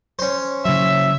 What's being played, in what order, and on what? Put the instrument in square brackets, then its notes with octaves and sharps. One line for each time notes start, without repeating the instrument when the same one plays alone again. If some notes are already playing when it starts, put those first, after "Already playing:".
[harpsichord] C#4 C5
[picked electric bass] C#3 F#3 [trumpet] E5